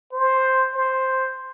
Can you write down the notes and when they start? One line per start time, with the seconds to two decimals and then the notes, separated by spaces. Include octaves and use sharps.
0.13 C5
0.75 C5